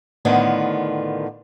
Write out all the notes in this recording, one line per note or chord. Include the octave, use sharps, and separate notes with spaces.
A2 D3 D#3 B3 F4